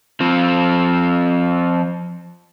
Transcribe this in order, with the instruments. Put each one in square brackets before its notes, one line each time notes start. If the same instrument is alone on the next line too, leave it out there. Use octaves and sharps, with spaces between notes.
[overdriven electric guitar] F3 C4